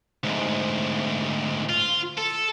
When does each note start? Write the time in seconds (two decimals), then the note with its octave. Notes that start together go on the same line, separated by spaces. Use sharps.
0.23 D2 G#2
1.69 F4
2.18 A4